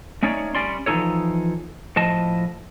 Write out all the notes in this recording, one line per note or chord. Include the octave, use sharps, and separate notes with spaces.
A3 C#4 D#4 C#5 D5
G3 C#4 D5 C6
E3 F3 C#4 D#4 A4 C#5
A2 F3 D#5 A5